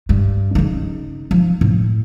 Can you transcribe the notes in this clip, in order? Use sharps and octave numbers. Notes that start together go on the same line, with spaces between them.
G2
C#3 D#4
F3
A2